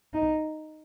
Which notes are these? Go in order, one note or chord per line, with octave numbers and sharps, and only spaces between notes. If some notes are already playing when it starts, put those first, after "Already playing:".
D#4